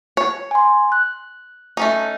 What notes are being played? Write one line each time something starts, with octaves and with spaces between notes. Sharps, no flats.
C#5
G#5 C6
F#6
A3 C#4 D#4